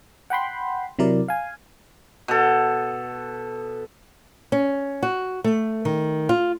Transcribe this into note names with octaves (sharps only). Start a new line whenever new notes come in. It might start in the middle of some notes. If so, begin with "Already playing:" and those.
F#5 G5 B5 C6
C3 F#3 E4 A#4 D5
F5 G#5
B2 A4
C#4
F#4
A3
D#3
F4